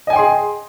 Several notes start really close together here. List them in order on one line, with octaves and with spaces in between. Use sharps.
D#5 G#5 G5 C6 G#4